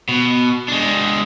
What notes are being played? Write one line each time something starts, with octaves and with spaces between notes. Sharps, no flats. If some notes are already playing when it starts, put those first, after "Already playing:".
B2
G#3 D4